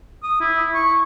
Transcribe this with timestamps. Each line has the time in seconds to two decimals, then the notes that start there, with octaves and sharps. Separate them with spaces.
0.23 D#6
0.41 E4
0.74 C#6